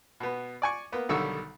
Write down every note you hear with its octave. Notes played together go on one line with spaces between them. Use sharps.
B2 B3
D5 G#5 C#6
A#3 B3
B1 D3 D#3 G3 C#5 E6